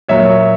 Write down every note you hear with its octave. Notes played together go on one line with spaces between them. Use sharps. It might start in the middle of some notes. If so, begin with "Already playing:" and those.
A#2 F#3 C#5 E5